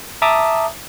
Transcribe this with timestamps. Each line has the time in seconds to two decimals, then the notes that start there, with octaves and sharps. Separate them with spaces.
0.22 E5 A5 A#5 D6 D#6